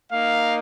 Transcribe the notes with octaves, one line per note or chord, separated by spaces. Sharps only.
A#3 D#4 F5